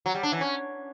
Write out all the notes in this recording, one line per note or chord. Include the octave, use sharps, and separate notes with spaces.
F#3
G3
D4
E3
C#4